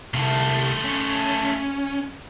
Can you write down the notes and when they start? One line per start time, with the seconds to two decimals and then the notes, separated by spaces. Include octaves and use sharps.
0.14 C2 A3 F4
0.85 C#4